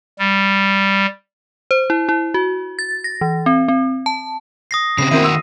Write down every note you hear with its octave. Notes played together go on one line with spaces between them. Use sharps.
G3
C5
E4
E4
F#4
A6
A#6
E3
C4
C4
A5
D#6 A#6 C7
C#3 A3 C4 C7
D#3 A#3 C4 E4 F#4 D#7
E6